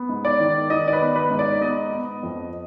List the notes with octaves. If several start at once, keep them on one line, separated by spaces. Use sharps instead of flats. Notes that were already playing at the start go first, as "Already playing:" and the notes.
Already playing: B3
G#2
D5
D#3
D#3 D#5
D5
B4
B3
B4
G#2
D5
B3 D#5
B3
F2